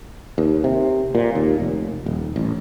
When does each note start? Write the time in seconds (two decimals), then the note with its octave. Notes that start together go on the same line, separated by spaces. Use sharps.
0.38 D#2
0.64 C3
1.15 A#2
1.35 D#2
1.60 F1
2.06 D#1
2.36 A1